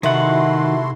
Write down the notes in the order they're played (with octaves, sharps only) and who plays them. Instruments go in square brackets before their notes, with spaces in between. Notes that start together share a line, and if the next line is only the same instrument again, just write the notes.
[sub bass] C3 [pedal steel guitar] D#3 F#5 [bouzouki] A3 [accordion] E4 F#4 C6